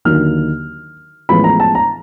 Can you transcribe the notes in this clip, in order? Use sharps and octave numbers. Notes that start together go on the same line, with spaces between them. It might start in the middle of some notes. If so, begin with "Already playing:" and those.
D#2 D3 F#3 A#3 D#4 F6
A1 A2 F3 G#3 B3 B5
A#5
A5
A#5